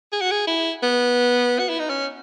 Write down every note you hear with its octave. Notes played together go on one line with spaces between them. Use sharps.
G#4
F#4
G#4
E4
B3
F#4
E4
D#4
C#4